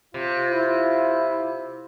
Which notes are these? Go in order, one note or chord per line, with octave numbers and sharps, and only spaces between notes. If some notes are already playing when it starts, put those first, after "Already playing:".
C3 F4
E4